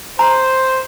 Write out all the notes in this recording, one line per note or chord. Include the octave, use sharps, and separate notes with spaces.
C5 A#5